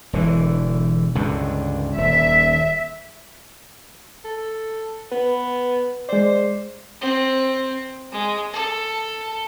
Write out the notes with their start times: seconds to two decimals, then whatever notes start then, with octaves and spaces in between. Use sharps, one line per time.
0.13 E1 D3 E3
1.15 C#2 G2 D3
1.97 D#1 E5
4.25 A4
5.12 B3 B4
6.09 G#3 C5 D5
7.01 C4
8.12 G#3
8.53 A4